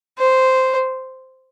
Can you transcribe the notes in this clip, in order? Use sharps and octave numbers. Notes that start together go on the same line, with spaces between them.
C5